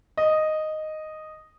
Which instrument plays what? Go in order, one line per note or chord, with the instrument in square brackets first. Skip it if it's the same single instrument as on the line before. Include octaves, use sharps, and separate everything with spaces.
[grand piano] D#5